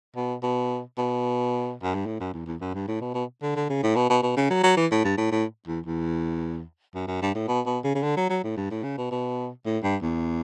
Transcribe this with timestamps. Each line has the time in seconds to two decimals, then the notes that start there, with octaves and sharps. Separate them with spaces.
0.16 B2
0.43 B2
0.98 B2
1.83 F#2
1.94 G2
2.06 A2
2.20 F#2
2.34 E2
2.46 E2
2.61 F#2
2.74 G2
2.88 A2
3.01 B2
3.14 B2
3.42 D3
3.56 D3
3.69 C#3
3.83 A2
3.96 B2
4.09 B2
4.22 B2
4.37 C#3
4.50 F#3
4.63 F#3
4.77 E3
4.91 A2
5.04 G2
5.17 A2
5.31 A2
5.67 E2
5.86 E2
6.94 F#2
7.07 F#2
7.21 G2
7.34 A2
7.48 B2
7.66 B2
7.84 C#3
7.95 C#3
8.03 D3
8.16 F#3
8.29 F#3
8.44 A2
8.57 G2
8.70 A2
8.83 C#3
8.98 B2
9.11 B2
9.66 A2
9.83 G2
10.02 E2